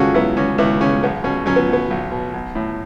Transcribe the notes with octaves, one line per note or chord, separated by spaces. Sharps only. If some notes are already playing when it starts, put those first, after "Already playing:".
Already playing: C#2 C#3 C#4 F#4 A4
F#3 B3 E4
C#2 C#4
C#2 B3 E4
C#3 C#4
B1 B3
B2 C#4
F#3 C#4
B3
B1 B3
B1
B2
B1
A2